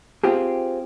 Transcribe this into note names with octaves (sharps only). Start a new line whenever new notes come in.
C4 F4 G4 G#4